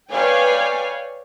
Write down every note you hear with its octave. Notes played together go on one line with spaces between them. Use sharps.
B4 C#5 D5 F5 G5 G#5